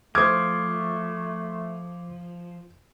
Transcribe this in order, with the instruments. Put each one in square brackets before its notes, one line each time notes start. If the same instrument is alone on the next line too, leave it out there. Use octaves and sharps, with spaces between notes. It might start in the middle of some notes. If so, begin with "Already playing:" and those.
[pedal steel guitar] F3 [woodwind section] A3 [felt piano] C5 G#6 [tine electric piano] D6 D#6 F6